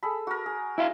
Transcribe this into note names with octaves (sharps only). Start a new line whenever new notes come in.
G#4 A4 B5
F#4 A#4
G#4
F#3 E4 E5 F5